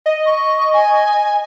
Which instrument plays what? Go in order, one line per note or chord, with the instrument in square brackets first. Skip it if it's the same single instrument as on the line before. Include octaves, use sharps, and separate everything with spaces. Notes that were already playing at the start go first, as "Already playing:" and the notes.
[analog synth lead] D#5
[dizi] C#6
G#5